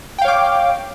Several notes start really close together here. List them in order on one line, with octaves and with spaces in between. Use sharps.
G5 F5 C#5 D6